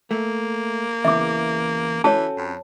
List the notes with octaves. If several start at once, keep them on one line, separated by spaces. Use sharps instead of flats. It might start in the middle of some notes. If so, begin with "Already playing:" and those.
A3 A#3
E2 C#3 E3 E5 D6
E3 C#4 F#4 A4 C#5 A5
F2